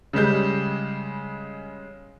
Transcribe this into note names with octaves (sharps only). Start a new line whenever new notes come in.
C#3 G3 G#3 G6